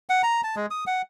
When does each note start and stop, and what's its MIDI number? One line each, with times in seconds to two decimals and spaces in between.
0.09 0.22 78
0.23 0.41 82
0.43 0.55 81
0.56 0.66 56
0.70 0.84 87
0.87 1.02 78